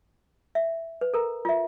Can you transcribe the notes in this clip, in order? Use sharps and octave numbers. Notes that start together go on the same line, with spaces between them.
E5
B4
A4 A#4 A#5
F4 E5